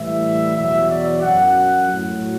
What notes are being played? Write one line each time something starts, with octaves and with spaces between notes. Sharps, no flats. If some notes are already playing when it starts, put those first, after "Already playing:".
Already playing: A2 E3 G3 E5
E2 B2 F#3 E5
D5
F#2 F#3 F#5
A2 F#3